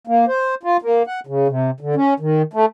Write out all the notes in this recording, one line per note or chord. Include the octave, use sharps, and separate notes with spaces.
A#3
C5
F4
A#3
F#5
C#3
C3
D3
C#4
D#3
A3